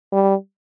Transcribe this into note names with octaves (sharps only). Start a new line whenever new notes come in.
G3